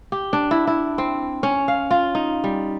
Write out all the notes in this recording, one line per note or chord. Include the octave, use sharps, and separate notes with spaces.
G4
D4
E4
E4
C4
C#4
F5
F4
D#4
G3